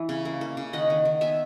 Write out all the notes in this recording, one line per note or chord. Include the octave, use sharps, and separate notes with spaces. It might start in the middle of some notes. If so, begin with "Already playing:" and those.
Already playing: E3
C#3
A#3
A#3
C#3
D#3 D#5 F#5
D#3
D#3
B3 E5 G#5